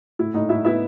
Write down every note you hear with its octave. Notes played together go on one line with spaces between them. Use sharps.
A2 E4
A2 D#4 D#5
A2 E4 E5
B3 E4 E5